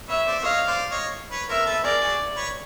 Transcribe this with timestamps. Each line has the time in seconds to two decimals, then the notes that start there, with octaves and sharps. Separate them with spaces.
0.09 B4 C#5 E5
0.26 C5 D5
0.38 E5
0.43 C#5 D#5 F5
0.67 C5 D5
0.91 C#5 D#5
1.31 B4 C#5
1.49 A#4 C5 E5
1.66 A4 B4
1.83 G#4 A#4 D5
2.01 F#4 G#4
2.36 B4 C#5